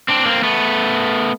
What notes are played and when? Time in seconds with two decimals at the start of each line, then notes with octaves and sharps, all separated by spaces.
0.08 C4 D4
0.26 A#3 C4
0.43 A3 B3